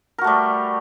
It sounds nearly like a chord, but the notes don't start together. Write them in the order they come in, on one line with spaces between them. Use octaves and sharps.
A#4 F#4 A3 G3